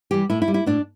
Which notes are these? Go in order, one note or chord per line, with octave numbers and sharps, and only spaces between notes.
E3 G3 G4
A2 E4
E4
G3
E4
A2 D4